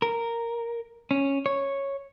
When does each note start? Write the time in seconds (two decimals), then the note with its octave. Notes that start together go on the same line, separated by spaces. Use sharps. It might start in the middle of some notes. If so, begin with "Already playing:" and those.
0.02 A#4
1.11 C#4
1.46 C#5